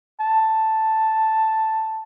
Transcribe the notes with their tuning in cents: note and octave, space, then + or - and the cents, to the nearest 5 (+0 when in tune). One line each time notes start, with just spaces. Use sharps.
A5 +0